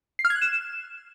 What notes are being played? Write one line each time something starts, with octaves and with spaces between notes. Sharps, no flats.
C7
F6
G#6
F#6
E7